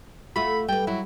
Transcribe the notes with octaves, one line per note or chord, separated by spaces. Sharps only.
A3 F4 F#4 B5
G3 B4 G5
F#3 E4